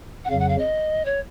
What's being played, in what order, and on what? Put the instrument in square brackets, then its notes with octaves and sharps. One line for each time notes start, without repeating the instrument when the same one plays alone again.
[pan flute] F#5
[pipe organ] F2 C#3 F#3 [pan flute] F5
[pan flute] F#5
F5
D#5
C#5